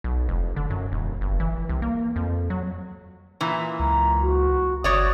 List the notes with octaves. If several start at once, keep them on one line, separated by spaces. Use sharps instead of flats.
B1
F1
D3
F#2
D#1
G1
E3
C2
A#3
F2
F#3
A#2 E3
C#2 A#5
F#4
G1 F#4 C#5 D5 D#6